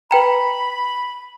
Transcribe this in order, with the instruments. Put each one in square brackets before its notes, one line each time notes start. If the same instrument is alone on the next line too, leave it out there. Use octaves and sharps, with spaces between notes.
[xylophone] B4 G5 A#5 [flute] B5